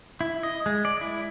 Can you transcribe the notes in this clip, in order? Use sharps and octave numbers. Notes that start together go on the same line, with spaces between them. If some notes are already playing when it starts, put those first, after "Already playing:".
E4
D#5
G#3
D5
E4